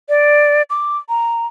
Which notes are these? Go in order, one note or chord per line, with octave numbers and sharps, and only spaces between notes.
D5
D6
A#5